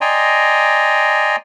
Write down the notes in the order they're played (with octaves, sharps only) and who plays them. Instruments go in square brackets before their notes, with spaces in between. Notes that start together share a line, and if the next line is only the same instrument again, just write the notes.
[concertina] D5 D#5 G5 G#5 A#5 C6